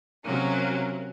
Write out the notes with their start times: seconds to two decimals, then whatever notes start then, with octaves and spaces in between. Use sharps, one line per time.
0.24 C3 F#3 A#3 C#4